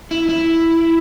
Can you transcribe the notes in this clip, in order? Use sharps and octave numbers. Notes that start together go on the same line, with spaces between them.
E4
E4